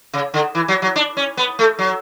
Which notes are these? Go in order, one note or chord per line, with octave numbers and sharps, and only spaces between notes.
C#3
D3
E3
F#3
F#3
D4
C#4
B3
A3
F#3